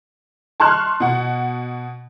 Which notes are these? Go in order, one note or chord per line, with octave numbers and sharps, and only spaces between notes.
A5 C6 C#6 F6 F#6
B2 F#5